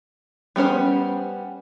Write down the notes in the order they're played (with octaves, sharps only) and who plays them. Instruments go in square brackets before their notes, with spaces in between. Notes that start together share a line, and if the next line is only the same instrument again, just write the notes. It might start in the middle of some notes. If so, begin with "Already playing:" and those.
[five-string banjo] G3 B3 C#4 C5